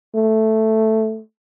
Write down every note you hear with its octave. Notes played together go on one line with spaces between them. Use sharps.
A3